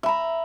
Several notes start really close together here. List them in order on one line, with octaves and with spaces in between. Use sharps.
E5 B5 A#5